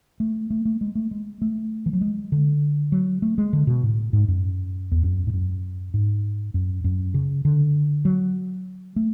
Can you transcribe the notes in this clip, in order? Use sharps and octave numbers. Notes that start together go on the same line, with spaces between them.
A3
A3
A3
G#3
A3
G#3
A3
E3
F#3
G#3
D3
F#3
A3
G#3
D3
B2
A2
G#2
F#2
E2
F#2
G#2
F#2
G#2
F#2
F#2
C#3
D3
F#3
A3